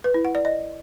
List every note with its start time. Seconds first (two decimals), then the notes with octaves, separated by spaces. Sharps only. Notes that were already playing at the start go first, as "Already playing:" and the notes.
0.04 B4
0.14 E4
0.25 F#5
0.35 D5
0.45 D#5